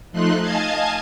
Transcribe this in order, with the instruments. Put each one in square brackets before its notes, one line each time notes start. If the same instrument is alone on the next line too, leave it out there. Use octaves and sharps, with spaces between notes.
[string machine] F3 A3 D#4 C6 F#6
D#5 F5 G#5 A5 G#6